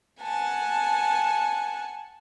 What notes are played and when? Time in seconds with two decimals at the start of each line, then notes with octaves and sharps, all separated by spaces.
0.22 F#5 G#5 A5